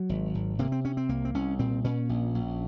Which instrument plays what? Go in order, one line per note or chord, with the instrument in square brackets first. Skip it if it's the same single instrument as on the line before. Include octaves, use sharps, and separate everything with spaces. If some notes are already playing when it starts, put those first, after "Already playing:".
Already playing: [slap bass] F#3
G#1
G#1
C3 A#3
C4
C3 C#4
C4
C2 A#3
C4
C2 C#4
A#2 C4
A#2 C#4
A#1
A#1